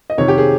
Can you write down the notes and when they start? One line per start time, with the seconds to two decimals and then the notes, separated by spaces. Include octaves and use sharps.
0.10 D#5
0.17 F2 C3 D#3 C#5
0.28 G4
0.38 G#4